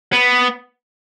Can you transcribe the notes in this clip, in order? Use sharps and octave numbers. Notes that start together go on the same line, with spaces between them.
B3